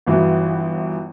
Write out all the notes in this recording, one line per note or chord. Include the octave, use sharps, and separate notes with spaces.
G1 E3 F#3